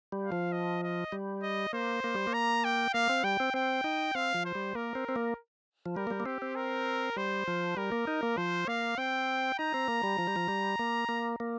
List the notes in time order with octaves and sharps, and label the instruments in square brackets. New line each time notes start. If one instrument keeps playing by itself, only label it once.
[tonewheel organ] G3
[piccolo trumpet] F5
[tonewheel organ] F3
[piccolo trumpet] D#5
D#5
[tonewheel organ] G3
[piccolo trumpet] D#5
[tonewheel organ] A#3 [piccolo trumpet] C5
[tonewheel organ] A#3
G3
A#3
[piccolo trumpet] A#5
G5
[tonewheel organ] A#3 [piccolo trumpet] F5
[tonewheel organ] C4
[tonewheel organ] G3 [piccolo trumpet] G5
[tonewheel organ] C4
[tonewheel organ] C4 [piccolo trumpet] G5
[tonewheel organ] D#4
[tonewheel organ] C4 [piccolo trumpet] F5
[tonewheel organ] F3
[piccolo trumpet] C5
[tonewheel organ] G3
[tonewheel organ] A#3 [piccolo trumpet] A#4
[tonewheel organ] C4
C4
A#3
F3
[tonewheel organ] G3 [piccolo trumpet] A#4
[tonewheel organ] A#3
G3
A#3
[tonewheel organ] C4 [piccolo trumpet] G4
[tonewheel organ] C4
[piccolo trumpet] A#4
[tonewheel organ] G3 [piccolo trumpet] C5
[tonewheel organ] F3
[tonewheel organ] G3 [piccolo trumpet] A#4
[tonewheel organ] A#3
D#4
A#3
[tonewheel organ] F3 [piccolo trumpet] C5
[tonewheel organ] A#3 [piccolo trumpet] F5
[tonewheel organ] C4 [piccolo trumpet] G5
[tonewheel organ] D#4 [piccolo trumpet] A#5
[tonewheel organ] C4
A#3
G3
F3
G3
F3
G3
A#3
A#3
A#3